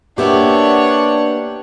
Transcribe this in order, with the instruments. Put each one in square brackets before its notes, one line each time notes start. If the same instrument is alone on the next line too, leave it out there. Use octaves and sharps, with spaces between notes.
[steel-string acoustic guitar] A#3 B3 E5 [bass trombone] D4 [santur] G4 G5 [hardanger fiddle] C#5 F#5